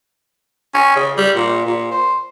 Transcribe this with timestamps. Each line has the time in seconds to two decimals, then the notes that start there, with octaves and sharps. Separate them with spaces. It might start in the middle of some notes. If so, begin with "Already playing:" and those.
0.74 C#4
0.96 C#3
1.17 G3
1.35 A#2
1.66 A#2
1.91 C5